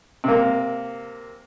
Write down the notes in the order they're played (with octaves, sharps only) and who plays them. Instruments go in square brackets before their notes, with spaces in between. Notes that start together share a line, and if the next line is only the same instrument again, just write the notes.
[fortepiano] C3 A#3